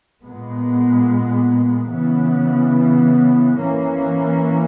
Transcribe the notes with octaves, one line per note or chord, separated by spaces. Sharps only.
A#2 G#3 B3
C#3 E3 B3
E3 A#3 C#4